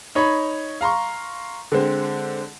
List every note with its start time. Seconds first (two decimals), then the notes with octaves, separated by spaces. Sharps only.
0.15 D#4 C#5 B5
0.81 F5 A#5 C6 C#6
1.72 D3 G#3 C4